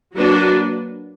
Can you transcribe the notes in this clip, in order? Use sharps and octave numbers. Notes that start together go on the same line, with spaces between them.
F#3 A#3 D4 F#4 B4